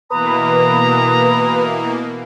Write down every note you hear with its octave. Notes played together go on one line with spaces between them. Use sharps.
B2 E3 A#3 B4 A#5 D#6